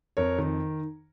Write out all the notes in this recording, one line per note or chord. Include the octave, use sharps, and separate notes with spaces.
F2 A#4 C#5
D#3